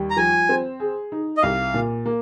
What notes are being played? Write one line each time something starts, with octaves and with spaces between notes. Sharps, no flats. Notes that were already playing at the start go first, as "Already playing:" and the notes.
Already playing: D#2 G3
A#5
F3 G#5
C4
G#4
D#4
D#5
C2 F5
A#2
A#3